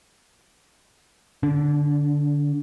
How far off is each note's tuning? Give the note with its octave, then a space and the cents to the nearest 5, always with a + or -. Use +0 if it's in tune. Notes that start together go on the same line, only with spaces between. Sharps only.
D3 +0 D4 -35